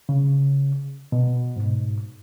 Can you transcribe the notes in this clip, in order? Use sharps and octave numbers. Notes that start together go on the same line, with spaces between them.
C#3
B2
G#2